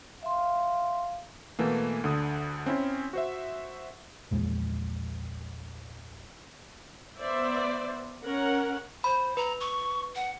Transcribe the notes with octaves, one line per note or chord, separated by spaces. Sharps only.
E5 F5 C6
B2 E3 A3 A#3
D2 D3 D#6
C4 C#4 E4
F#4 C5 E5
A#1 E2 G#3
B3 C5 D5 E5
C#4 A#4 F#5
C5 B5
B4 A#5
C#6
F#5